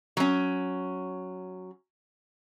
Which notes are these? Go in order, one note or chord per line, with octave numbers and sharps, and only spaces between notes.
F#3 C#4